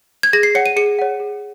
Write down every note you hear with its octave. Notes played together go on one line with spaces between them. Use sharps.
G#6
G#4 A#6
C7
C#5 F#5 C#7
D#7
G#4 C#7
C#5 F#5
G#4